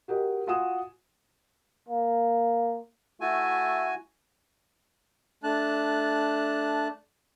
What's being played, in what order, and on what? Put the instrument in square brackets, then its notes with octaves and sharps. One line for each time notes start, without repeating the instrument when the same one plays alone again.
[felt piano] F#4 G4 A#4 D#5
F4 F#4 G#5 D#6 E7
[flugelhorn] A#3
[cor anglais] A3 [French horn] E4 [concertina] F#4 G#5
[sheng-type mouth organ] A3 D4 A5 F#6